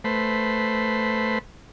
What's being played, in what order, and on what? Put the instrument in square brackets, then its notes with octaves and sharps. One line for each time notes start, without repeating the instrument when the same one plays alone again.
[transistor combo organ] A3 B4 C5